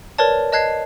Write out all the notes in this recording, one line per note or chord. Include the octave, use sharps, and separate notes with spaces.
A#4 B4 C#5 D5 A5
D#5 A5 F#6 G#6 C7